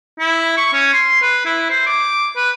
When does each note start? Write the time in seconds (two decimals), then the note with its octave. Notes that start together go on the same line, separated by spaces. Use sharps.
0.19 E4
0.57 C#6
0.73 C#4
0.93 C6
1.21 B4
1.45 E4
1.70 C5
1.87 D6
2.36 B4